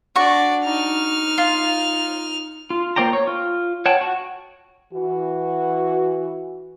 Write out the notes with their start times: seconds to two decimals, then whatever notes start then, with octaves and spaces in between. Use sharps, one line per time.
0.16 D4 F#4 D5 C#6
0.65 D#4 F6
1.38 F4
2.70 F4
2.96 A#3 C5 D5 G5 A#5
3.13 C#5
3.27 F4
3.86 C#5 F#5 G5 A5
4.01 F#4
4.93 E3 F#4